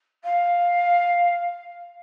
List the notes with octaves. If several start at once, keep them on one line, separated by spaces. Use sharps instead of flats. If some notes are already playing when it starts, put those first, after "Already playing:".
F5